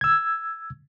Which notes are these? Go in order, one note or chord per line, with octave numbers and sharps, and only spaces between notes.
E6 G#6